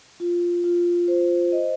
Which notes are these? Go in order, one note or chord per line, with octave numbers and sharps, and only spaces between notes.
F4
F4
C5
D#5